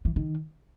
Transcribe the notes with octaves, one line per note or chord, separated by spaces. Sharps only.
E3
D#3